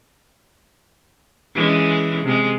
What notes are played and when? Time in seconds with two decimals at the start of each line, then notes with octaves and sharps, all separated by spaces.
1.54 E3 G#3 C#4
2.25 C3 G#3